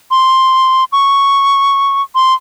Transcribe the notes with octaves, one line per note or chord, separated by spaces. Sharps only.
C6
C#6
C6